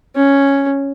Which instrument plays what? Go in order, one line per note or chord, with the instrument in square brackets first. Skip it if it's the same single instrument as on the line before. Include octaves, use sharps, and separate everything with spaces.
[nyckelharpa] C#4